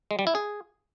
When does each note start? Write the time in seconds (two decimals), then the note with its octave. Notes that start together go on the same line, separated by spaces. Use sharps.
0.11 G#3
0.19 G3
0.27 E4
0.35 G#4